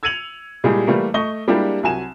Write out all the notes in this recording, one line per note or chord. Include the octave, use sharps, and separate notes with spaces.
E6 G#6 C#7 D#7 F7 F#7
A#2 G3 G#3 E4 G4 G#4
E3 G3 A3 A#3
A3 D#5 C#6 G7
G3 G#3 A#3 D4 E4 G4
C2 F#3 G#5 E7